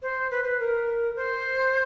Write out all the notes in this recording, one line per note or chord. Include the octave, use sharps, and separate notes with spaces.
C5
B4
B4
A#4
C5